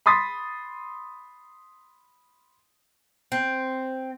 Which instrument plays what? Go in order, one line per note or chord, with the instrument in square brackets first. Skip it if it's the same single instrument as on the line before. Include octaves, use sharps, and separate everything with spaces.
[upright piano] B5 C6 D#6 A6 B6
[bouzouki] C4